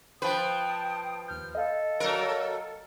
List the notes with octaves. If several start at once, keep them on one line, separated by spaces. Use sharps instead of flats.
F3 B4 G5 A5 D#6
D#2 F6 G6
A4 D#5 F5
F#3 A#4